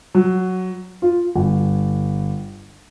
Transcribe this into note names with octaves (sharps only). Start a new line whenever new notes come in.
F#3
F4
G1